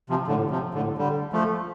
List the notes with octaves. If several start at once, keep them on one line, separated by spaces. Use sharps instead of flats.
C3 F3
A2 D3
C3 F3
A2 D3
D3 G3
F3 A3